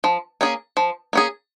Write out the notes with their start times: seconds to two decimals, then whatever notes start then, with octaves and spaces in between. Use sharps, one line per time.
0.04 F3
0.41 A#3 C#4 G#4
0.77 F3
1.13 A#3 C#4 G#4